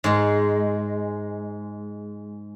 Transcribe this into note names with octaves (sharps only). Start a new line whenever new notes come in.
G#2 G#3